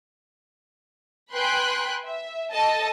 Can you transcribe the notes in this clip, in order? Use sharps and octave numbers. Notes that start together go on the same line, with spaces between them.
B4 G5 G#5 B5 C6 F#6
E5
A4 D#5 A5